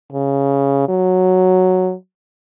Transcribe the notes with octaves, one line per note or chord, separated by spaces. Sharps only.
C#3
F#3